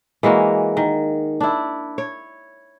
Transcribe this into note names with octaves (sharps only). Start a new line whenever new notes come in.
E3 G#3 A#3 F#4
D#3
D4 E4
C#5